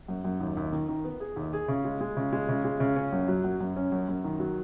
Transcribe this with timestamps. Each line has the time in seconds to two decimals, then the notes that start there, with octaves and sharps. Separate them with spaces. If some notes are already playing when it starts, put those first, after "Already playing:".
0.08 F#2
0.25 F#2
0.40 D#2
0.57 D#2
0.72 D#3
0.89 D#3
1.05 B3
1.20 G#4
1.36 D#2
1.53 G#4
1.68 C#3
1.85 G#3
2.01 G#3
2.17 C#3
2.33 G#3
2.49 C#3
2.65 G#3
2.80 C#3
2.96 C#4
3.12 F#2
3.28 F#3
3.44 F#2
3.60 F#2
3.76 C#4
3.92 F#2
4.09 F#2
4.24 D#3
4.40 F#3